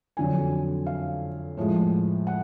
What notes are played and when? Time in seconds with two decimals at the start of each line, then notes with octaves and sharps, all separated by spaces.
0.17 F2 D3 F#3 G#5
0.86 F5
1.57 A2 F3 G#3
2.27 F#5